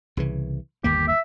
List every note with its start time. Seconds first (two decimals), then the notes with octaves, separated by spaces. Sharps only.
0.17 C2 C#3 E3
0.84 G1 D#2 A#3 G4
1.08 E5